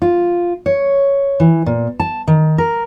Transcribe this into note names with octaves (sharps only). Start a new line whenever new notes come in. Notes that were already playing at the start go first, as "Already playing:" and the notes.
F4
C#5
E3
A#2
A5
D#3
A#4